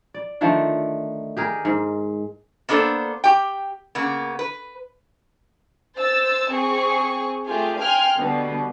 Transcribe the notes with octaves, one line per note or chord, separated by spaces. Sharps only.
D5
D3 D#3 F3 A3
G4 G#4 A#4
G#2
A#3 B3 D4 A4 C5
G4 G5
C#3 A#3 B3
B4
C5 E6 A6
C4 G#4 C#6
A3 F4 G4 G#4
F5 G5 G#5 C6 F6
B2 D3 G3 B3